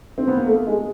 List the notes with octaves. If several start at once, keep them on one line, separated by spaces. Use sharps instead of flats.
C4
B3
A#3
A3
G#3